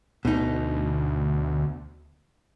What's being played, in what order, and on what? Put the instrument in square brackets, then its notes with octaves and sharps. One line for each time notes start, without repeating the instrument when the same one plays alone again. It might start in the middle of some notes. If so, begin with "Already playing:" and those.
[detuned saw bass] D2 [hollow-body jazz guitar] B2 D#4